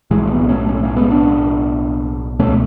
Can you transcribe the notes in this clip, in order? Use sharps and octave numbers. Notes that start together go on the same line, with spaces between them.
B1 A2 E3 G#3
A3
G#3 B3
A3 C#4
A3 C#4
A3 C#4
G#3 B3
B3 D4
C#2 B2 A3 C#4